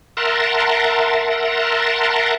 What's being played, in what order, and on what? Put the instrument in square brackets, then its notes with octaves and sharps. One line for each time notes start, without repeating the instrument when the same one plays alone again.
[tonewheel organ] A#4 E5 F#5 A5 A#5 C6